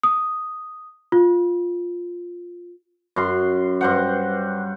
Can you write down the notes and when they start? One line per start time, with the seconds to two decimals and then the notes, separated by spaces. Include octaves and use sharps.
0.03 D#6
1.12 F4
3.16 F#2 C6
3.81 G2 C5 F#5